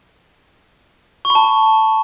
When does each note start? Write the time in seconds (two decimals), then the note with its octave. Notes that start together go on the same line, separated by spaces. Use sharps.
1.25 C#6
1.30 B5
1.35 A5